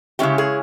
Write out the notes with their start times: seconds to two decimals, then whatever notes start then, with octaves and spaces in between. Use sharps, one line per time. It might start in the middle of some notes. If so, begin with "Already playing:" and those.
0.19 C#3 G#3 C#4 E4 G4
0.38 G#4